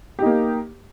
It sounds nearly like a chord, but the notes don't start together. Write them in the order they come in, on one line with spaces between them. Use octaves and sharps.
G4 D#4 A#3